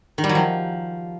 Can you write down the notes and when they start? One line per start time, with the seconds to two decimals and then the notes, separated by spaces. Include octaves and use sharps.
0.18 D#3
0.24 G3
0.29 F#3
0.35 F3